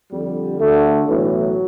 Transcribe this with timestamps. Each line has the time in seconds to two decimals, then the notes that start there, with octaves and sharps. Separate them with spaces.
0.12 F2 D3 G3
0.60 D2 D3 A3
1.08 B1 A2 E3 F#3